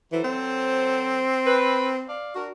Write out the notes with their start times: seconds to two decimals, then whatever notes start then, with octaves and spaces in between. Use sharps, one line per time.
0.12 E3 F#3 A4 C5
0.24 C4
1.45 B4
2.06 D5 F5
2.35 D4 F#4 A#4